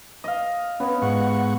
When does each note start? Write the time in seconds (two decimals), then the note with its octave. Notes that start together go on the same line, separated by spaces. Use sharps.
0.24 D#5 F5
0.80 B3 C#4
1.02 G#2 F#5 C#6